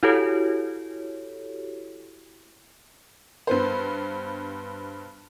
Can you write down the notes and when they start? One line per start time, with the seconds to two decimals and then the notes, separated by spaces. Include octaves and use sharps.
0.03 E4 F#4 G4 A4 C#5
3.47 G2 B3 C5